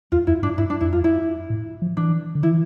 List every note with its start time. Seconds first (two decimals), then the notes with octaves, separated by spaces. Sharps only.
0.12 E2 F4
0.27 F2 E4
0.42 G2 D4
0.58 G2 E4
0.70 D4
0.81 F2 E4
0.93 F4
1.04 E4
1.50 A2
1.82 F3
1.97 E3 D4
2.35 D3
2.43 E3 E4